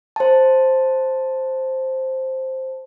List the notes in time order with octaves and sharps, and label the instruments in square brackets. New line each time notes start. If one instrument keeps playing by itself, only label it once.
[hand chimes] C5 A5